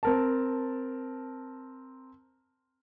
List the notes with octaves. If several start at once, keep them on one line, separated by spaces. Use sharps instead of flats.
C4 A#4 A5